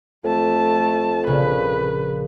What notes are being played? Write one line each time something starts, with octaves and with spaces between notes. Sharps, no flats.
F2 A3 A5
A#1 C#3 B4